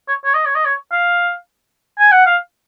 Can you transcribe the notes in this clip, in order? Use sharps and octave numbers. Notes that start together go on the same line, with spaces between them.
C#5
C#5
D#5
C#5
D#5
C#5
F5
G#5
F#5
F5